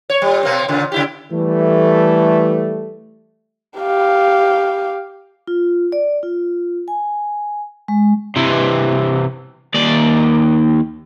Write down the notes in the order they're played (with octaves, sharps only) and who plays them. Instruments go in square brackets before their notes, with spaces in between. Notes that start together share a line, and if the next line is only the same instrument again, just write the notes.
[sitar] C#5
A#2 G3
B2 A#3 C4
A#2 C#3
C#3 E4 G4
[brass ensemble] E3 G3 A3
[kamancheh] G4 F5
[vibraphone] F4
D5
F4
G#5
G#3
[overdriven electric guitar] C3 E3
D#2 D5